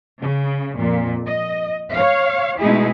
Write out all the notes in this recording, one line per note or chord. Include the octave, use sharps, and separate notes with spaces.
C#3
F2 A#2
D#5
C#5 F5
B2 G#3 A3 D#4 E4 G#4